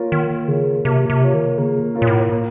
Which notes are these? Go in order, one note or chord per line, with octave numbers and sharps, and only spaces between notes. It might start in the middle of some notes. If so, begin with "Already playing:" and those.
Already playing: A#3 F4 A#4 C#5
D#3 A#3
C#3 F4 A#4 C#5
C3 A#3
C3
F4 A#4 C#5
D#3
C#3 A#3
F4 A#4 C#5
A#2
A2
A#3